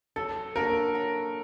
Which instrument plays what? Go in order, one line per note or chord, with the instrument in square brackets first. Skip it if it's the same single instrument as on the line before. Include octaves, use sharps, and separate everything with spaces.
[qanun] F#3 [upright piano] A4
[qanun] A#3 D4 F#4 [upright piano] A#4
[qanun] F#3